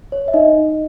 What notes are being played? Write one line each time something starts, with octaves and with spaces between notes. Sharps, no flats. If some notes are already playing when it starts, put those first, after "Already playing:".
C#5
E5
D#4 D#5